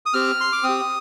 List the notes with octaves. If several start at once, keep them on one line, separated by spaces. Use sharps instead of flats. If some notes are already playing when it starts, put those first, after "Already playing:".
D#6
C4 G4 F6
C6
D6
C4 D#6
G4